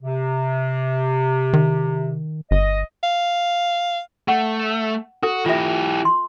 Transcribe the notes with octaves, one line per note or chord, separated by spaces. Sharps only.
C3
D#3
G1 D#5
F5
A3 F#5
F#4 A4
E3 F4 G4 E5
C6